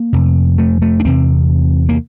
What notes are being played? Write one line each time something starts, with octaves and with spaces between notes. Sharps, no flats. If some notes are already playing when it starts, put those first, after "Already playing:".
Already playing: A#3
F2 C3
A3
A3
D4
E2 C3 C4
A#3